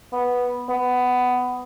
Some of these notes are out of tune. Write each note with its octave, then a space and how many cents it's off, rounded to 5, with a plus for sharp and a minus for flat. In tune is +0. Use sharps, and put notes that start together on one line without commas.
B3 -5
B3 +15